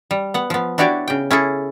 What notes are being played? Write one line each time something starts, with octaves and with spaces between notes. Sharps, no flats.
G3
B3 F#5
F3 B3
D4 E4 F#4 G4 C#5 D5
C#3 G5
C#4 E4 G#4 A4